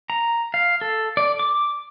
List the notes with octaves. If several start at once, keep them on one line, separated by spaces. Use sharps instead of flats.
A#5
F5
A4
D5
D6